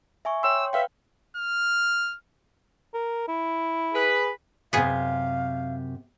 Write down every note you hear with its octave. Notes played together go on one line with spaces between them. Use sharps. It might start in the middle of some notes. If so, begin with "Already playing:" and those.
E5 G#5 C#6
C#5 G5 C6 E6
B4 E5 F5 G5
F6
A#4
E4
G#4 B4
F#2 C3 B3 G#4 F5